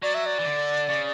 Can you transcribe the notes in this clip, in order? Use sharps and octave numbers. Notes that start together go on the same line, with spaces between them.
F#3 D5
E5
D5
E3
D3
C#3